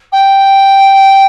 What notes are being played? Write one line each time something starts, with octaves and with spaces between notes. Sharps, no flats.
G5